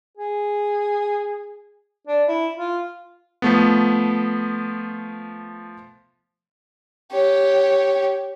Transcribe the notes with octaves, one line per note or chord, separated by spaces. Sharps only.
G#4
D4
E4
F4
F3 A3 B3
G4 C#5